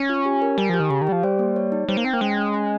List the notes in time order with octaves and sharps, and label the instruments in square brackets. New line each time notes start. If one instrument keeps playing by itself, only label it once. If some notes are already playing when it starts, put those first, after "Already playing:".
Already playing: [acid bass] C#4
[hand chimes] F4
G4
A#4
[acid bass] G3 [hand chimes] G#5
[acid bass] F3 [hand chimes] G4
[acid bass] D#3
[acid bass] C#3 [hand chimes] G4
[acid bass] D#3
[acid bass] G3 [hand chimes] G4
[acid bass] F3
[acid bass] G3 [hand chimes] C5
[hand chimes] A#3
C#5
D#4
[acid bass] G3 [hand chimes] C5
[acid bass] A#3
[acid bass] C4 [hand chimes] G5
[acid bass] A#3
[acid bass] G#3 [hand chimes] C#4
[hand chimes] C#4
C#4